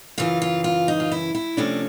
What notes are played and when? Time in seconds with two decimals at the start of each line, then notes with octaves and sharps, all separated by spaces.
0.18 F#2 C#3 E3 F4
0.42 F4
0.64 F4
0.88 D#4
1.00 F4
1.12 E4
1.35 E4
1.57 C3 F3 A3 C#4 D4